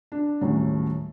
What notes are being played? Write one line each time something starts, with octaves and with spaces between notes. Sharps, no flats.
D4
D#1 A2 F#3 C#4